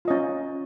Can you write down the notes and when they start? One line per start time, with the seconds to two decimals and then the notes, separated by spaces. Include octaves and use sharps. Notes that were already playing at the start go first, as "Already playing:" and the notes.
0.05 F4
0.08 D#5
0.10 C#4